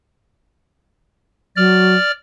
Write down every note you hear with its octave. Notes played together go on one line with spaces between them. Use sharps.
F#3 D5 F6